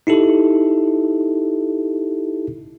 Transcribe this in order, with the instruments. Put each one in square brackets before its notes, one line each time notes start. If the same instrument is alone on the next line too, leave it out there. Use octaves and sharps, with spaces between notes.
[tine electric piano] D#4 E4 G4 A4